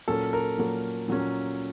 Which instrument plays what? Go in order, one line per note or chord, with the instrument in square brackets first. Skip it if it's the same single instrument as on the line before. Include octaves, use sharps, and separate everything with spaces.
[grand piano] A#2 F#3 A#3 C#4 A4
A#4
A#2 F#3 A#3 C#4
A#2 F#3 A#3 C#4